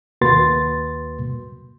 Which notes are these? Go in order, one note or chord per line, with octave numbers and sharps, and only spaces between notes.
D#2 A#3 F#4 B4 C6 A6